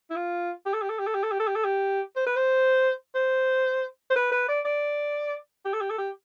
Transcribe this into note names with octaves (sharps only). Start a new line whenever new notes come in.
E4
F4
G4
A4
G4
A4
G4
A4
G4
A4
G4
A4
G4
A4
G4
C5
B4
C5
C5
C5
B4
B4
D5
D5
G4
A4
G4
A4
G4